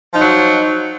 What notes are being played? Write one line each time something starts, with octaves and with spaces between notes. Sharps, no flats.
F3 F#3 D#4